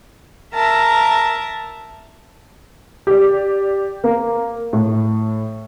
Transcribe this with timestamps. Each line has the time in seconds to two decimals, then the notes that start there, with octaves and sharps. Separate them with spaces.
0.53 A#4 E5 A5 A#5
3.07 G4 D5
4.04 A#3
4.73 A2